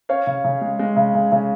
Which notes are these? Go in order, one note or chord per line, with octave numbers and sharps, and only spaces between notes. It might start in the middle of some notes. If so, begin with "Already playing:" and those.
C#4 C#5 F5
C#3
C#3
G#3
G#3
C#3
C#3
C#3